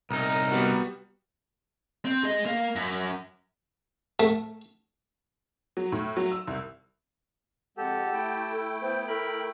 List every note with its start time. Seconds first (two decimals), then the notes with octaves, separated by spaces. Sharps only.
0.11 C2 D#4 A#4
0.52 G3 B3 F#4
2.05 C4
2.23 G#4 D#5
2.45 A#3
2.76 F#2
4.20 A3
5.77 F#3
5.92 A2
6.17 F#3
6.32 E6
6.47 C2
7.77 F2 G#3 G4 A4 F#5
8.13 A3 E4 G5
8.51 A4
8.81 B3 C5
9.08 A4 A#4 B5